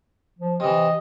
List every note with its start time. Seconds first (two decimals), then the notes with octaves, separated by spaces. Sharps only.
0.39 F3
0.60 C3 E3 D#5